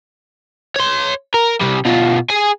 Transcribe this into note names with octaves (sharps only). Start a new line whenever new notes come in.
C#5 C6
A#4
C3 G3
B2 F4
G#4 G#5